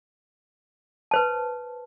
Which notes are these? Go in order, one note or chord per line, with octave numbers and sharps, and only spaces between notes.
B4 C5 A5